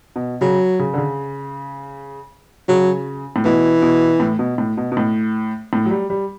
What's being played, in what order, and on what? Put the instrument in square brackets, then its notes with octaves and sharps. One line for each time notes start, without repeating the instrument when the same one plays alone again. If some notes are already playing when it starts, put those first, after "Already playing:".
[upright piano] B2
[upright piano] C#3 [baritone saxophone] F#3
[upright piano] C#3
D3
C#3
[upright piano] C#3 [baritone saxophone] F#3
[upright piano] A2
[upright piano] B2 [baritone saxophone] E3
[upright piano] B2
A2
B2
A2
B2
B2
A2
A2
F#3
G3
G3